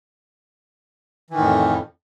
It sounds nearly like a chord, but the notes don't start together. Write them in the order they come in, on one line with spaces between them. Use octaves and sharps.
E3 D#3 A2 F2